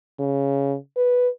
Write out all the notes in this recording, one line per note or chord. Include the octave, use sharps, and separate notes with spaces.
C#3
B4